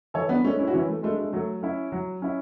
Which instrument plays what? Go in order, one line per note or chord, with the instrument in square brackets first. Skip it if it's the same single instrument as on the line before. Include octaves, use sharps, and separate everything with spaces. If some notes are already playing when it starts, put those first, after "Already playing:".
[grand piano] E3 [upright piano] A4 C#5
[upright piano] B3 D4
[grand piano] G#3 [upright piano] A3 C#4
[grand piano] D4
[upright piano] C#4 E4
F#4
[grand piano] E3 [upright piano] C#4 E4
[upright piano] A3
[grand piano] G#3 D4 [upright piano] A3
[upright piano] A3
[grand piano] F#3 [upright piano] A3
[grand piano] C#4 E4
F#3
C#4 E4